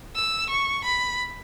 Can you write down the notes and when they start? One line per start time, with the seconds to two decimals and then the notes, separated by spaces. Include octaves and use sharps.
0.15 E6
0.50 C#6
0.84 B5